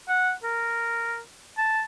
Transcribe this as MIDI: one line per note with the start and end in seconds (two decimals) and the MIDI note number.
0.08 0.32 78
0.44 1.19 70
1.58 1.83 81